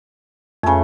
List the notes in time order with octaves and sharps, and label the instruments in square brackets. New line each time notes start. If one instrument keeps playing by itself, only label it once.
[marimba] F2 G#5 [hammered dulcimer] C#3 A3